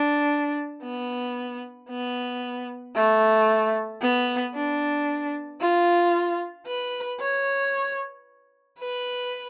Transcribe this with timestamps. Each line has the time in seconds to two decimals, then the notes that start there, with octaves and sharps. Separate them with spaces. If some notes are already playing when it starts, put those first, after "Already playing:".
Already playing: D4
0.83 B3
1.89 B3
2.95 A3
4.02 B3
4.54 D4
5.61 F4
6.66 B4
7.20 C#5
8.79 B4